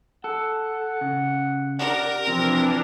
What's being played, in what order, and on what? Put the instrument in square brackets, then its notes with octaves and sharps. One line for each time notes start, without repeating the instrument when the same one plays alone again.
[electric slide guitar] A4 [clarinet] F#5
[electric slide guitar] C#3
[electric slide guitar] G4 F#5 [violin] A#4 [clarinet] D5
[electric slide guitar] C3 F3 C5 [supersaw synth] E3 D4 [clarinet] C4